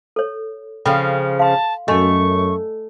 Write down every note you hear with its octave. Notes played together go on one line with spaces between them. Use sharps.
A4 C#5
C#3 F3 A4 G5 B5
F5 A5 C6
F#2 A3 D#5 G#5 C6 C#6